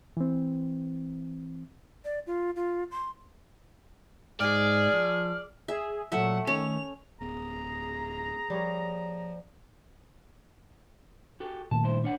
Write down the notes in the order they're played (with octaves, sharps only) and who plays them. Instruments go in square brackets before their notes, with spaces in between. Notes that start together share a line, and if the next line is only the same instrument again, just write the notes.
[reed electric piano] E3 C4
[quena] D5
F4
F4
C6
[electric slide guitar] G#2 [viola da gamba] G#4 [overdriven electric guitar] D5 [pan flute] F6
[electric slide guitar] F3
[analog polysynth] G#4 [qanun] E5
[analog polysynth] A#2 F#3 [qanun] A3 E5 [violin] F#5
[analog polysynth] D#3 A3 [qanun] C#4 [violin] F7
[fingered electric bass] D1 B3 [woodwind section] G#4 A#5
[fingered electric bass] F3 [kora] G3 A#3 C#5
[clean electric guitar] F#4 G4 A4
[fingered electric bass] A#2 D#3 A3 [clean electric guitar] A5
[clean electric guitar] G2 E4 C5
D4 C#5 F#5